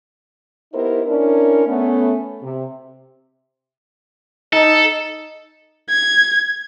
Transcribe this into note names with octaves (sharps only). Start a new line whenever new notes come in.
B3 D#4 E4 G4 A#4 C5
C#4 D4 E4 A#4
A3 B3 C#4
C3
D#4 A4
G#6